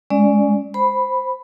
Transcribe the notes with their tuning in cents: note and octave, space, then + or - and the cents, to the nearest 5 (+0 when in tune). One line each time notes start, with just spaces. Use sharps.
G#3 +0 C#4 +20 D5 +0
C5 +0 B5 +0